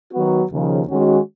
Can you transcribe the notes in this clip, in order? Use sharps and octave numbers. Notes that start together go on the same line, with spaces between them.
D#3 F#3 B3 F#4
D#2 C#3 F3
D#3 G#3 C#4 F#4